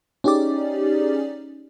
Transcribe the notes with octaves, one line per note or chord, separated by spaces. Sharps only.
C#4 D#4 G4 G#4 D5